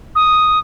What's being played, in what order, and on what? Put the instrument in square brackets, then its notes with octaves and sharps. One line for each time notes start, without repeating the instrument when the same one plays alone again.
[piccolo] D#6